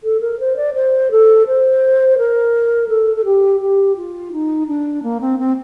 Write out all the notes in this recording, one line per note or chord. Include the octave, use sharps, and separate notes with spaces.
A4
A#4
C5
D5
C5
A4
C5
A#4
A4
A4
G4
G4
F4
D#4
D4
A#3
C4
C4